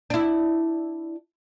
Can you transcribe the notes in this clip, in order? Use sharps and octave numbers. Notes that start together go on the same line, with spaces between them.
D4 E4